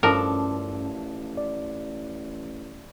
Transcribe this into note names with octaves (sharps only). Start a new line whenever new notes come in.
A1 G2 F3 C#4 D4 A4 A#4
D5